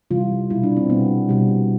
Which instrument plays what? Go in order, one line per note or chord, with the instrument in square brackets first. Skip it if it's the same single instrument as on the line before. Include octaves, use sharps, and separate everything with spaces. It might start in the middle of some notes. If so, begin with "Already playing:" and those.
[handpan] C3 E3 G3 F4
B2 G3 E4
D4
C4
B2 G3 B3
B2 G3